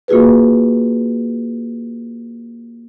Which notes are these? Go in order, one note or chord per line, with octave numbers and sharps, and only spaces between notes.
A#3 F4 F#4 G#4 B4